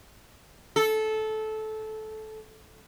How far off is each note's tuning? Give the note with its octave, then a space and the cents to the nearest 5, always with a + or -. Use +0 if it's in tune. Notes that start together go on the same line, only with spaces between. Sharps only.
A4 -15